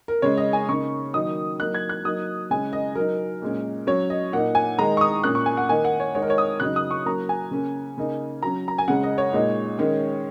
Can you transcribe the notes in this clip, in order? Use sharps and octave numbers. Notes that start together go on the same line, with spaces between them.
A#4
C#3 G#3 C#4 C#5
D#5
G#5
C#3 A#3 D#4 C#6
D#3 F#3 A#3 D#4 D#6
F#3 A#3 D#4 F#6
G#6
F#6
F#3 A#3 D#4 D#6
C#3 G#3 C#4 G#5
D#5
F#3 D#4 A#4
A#2 G#3 C#4
F#3 C#4 C#5
D#5
A#2 A#3 D#4 F#5
G#5
D#3 G#3 D#4 A#5
C#6
D#6
A#2 A#3 C#4 F#6
C#6
G#5
F#5
D#3 A#3 D#4 G#5
F#5
C#5
D#3 G#3 D#4 C#5
A#4
C#5
D#6
C#3 F#3 D#4 F#6
D#6
C#6
F#3 A#3 C#4 A#5
G#5
C#3 A#3 C#4
C#3 A#3 D#4
F#3 C#4 A#5
A#5
G#5
C#3 G#3 C#4 F#5
D#5
C#5
A#2 G#3 D#4
D#3 G#3 C#4